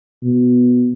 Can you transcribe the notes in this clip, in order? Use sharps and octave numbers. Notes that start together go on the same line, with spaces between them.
B2